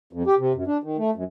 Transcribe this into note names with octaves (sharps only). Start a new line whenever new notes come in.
F2
G4
C3
F#2
D4
D#3
A3
F#2